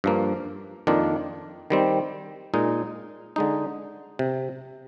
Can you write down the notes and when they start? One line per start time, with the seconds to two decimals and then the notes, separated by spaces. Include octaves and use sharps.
0.04 G2 F3 A#3
0.87 F2 D#3 A#3 D4 F4
1.70 D#3 G3 C4
2.54 A#2 G#3 D#4
3.36 D3 G#3 D#4
4.19 C3